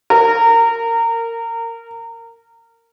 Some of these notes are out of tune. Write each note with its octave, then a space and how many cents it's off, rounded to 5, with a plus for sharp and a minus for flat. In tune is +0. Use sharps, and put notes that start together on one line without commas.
A#4 -20